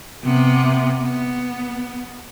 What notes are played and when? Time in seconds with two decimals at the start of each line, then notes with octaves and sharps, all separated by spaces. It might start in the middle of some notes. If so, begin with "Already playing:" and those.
0.24 C3 B3
1.02 B3